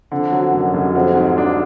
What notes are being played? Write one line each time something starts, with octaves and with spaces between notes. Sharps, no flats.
F2 D3
F#3
F1 F#2
F1
F2 F#3
G#2
D4